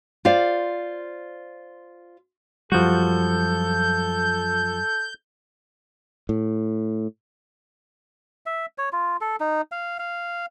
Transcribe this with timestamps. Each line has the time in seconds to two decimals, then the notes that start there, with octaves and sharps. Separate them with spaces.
0.25 F4 C5 D5 F5
2.72 F#2 F3 G3 F#4 A4 G6
6.29 A2
8.46 E5
8.78 C#5
8.93 F4
9.21 A4
9.40 D#4
9.72 F5
9.99 F5